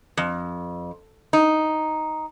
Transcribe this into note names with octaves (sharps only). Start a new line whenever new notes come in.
F2
D#4